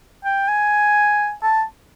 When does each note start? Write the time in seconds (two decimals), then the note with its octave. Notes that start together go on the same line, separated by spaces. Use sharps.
0.25 G5
0.48 G#5
1.43 A5